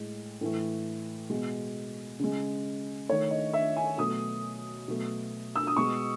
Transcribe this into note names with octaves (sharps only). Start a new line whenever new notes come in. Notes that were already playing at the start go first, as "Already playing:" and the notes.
Already playing: A2 G#3
A2 E3 A3
B2 G#3
C#3 G#3
D#3 A3 C#5
D#5
E5
G#5
B2 F#3 A3 D#6
B2 F#3 A3
E6
D#6
B2 G#3 C#6